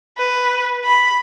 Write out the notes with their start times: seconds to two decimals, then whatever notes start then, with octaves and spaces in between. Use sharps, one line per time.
0.18 B4
0.84 B5